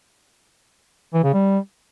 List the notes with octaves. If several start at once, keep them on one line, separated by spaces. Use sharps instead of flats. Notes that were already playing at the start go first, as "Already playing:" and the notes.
E3
C#3
G3